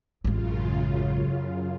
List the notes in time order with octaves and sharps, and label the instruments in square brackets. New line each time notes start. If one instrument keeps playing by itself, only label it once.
[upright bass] A1 G#3 [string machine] F#2 C#3 F4